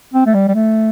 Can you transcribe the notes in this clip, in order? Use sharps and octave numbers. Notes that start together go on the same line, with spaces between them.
C4
A3
G3
G3
A3